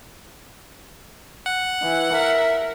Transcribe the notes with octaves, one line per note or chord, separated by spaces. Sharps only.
F#5
E3
A#4 E5